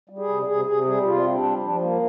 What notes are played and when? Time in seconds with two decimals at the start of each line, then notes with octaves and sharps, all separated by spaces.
0.09 G3
0.18 G#4
0.28 C3
0.47 C3 G#4
0.66 C3 G#4
0.85 G3 G#4
1.05 C3 F4
1.24 C4
1.34 D4
1.43 G3
1.63 F3 D4
1.81 A#3